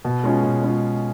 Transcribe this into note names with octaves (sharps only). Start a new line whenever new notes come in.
B2
G#3 C#4 F4
B2
G#3 C#4 F4